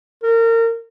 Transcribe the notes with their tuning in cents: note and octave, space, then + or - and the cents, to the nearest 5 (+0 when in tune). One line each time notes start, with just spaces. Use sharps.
A#4 -30